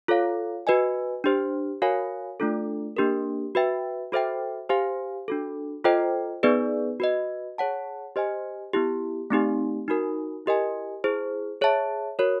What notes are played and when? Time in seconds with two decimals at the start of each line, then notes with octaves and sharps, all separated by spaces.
0.08 F4 A4 C#5 F5
0.67 F#4 B4 D#5 G#5
1.24 D4 G4 C5
1.82 F#4 A#4 C#5 F5 G#5
2.40 A3 D4 F4 A4
2.97 A#3 D4 G4 A#4
3.55 F#4 B4 E5 G5
4.12 F#4 A4 C5 E5 G5
4.69 G4 C5 F5 G#5
5.28 D4 F#4 A4
5.84 F4 A4 C5 D#5 G5
6.43 B3 D#4 G#4 B4 D5
7.00 F#4 B4 D#5
7.58 G#4 C#5 F#5 A5
8.16 G4 C5 D#5 G#5
8.73 B3 E4 G4
9.30 A3 C4 D#4 G4
9.88 D#4 F#4 A#4
10.46 E4 G4 A#4 D#5 G#5
11.04 E4 G#4 C5
11.61 G#4 C#5 E5 A5
12.19 F#4 A#4 C#5